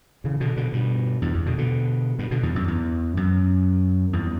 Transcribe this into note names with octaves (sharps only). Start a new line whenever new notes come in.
C#3 E3
B2 D3
B2 D3
G2 B2
E2 G2
E2
B2 D3
B2 D3
G2 B2
B2 D3
E2 G2
F#2
E2
F#2
E2 G2